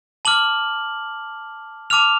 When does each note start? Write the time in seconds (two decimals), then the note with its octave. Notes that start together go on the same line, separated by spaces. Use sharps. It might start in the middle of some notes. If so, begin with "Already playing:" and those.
0.25 A5 D6 F6 F#7
1.90 A5 D6 F6 F7